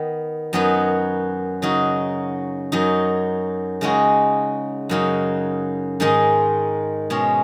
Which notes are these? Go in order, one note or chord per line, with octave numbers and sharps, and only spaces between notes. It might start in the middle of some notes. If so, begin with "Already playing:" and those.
Already playing: D#3 B3
F#2 F#3 B3 D#4 B4
C#3 F#3 D#4 F#4
F#2 F#3 D#4
C#3 G#3 D#4 F#4
F#2 C#3 F#3 D#4
G#2 D#3 G#3 D#4
B2 G#3 C#4